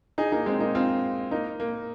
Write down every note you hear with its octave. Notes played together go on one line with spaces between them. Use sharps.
D#4 G#4
A#3 D#4
G#3 C4
A#3 D#4
C4 F4
A#3 D#4
A#3